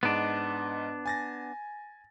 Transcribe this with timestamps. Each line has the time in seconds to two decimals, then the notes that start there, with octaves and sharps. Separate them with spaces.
0.03 G#2 B3 D4 D#5
1.06 G#5 A6 A#6